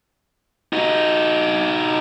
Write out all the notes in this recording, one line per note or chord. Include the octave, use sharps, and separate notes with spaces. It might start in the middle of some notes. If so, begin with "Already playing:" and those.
D#4 F#4